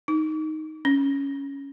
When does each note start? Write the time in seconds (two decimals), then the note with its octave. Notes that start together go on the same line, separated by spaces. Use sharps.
0.08 D#4
0.85 C#4